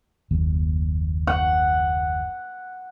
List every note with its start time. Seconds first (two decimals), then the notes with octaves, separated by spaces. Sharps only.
0.31 F#1 D#2
1.27 F#5